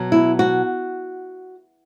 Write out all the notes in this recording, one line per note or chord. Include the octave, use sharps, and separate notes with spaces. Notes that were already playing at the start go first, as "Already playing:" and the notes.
Already playing: B2 F#3
E4
F#4